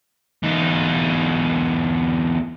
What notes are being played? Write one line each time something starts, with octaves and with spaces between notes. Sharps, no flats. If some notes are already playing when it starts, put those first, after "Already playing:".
E2 D#4